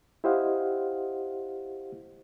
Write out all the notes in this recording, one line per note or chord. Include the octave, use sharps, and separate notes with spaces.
E4 G4 C5 D#5 F5 F#5